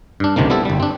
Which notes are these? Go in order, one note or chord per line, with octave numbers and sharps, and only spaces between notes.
G2 D4
C#2 C3 D#3 F3 A#3
G3 B3 C4 E4 A4
G1 G3
C4 D4